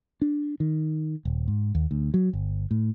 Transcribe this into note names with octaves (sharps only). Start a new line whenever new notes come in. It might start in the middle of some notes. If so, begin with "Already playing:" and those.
D4
D#3
D#1
G#2
D#2
D2
F#3
G1
A2